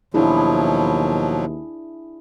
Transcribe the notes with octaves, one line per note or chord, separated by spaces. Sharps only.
D#2 B2 F3 F#3 D4 E4 G#4